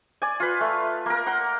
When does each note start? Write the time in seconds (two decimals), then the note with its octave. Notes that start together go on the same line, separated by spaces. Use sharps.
0.22 D5 G#5
0.40 F4 B4
0.61 A3
1.06 A#3 A#4
1.26 F#5 C6